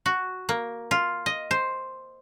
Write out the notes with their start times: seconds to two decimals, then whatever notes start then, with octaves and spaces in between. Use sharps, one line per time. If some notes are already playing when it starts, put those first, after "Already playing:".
0.06 F#4
0.49 A#3
0.91 F4
1.26 D#5
1.51 C5